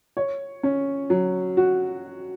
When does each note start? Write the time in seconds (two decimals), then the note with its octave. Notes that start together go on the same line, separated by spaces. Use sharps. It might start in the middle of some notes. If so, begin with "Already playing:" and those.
0.17 C#5
0.63 C#4
1.10 F#3
1.57 F#4